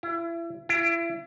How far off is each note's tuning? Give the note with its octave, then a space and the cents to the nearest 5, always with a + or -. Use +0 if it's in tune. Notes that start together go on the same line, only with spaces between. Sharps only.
E4 +35
E4 +35